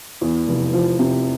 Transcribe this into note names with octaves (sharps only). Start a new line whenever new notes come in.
E2
F1
F3
C3